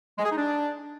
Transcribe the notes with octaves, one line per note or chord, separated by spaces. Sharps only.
G#3
G#4
D#4
D4